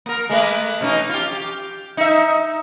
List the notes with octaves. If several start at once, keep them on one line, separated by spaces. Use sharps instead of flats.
A#3 A#4
G#3 A3 B4
B2 C#4 D#4
F4 G4
G4
D#4 E5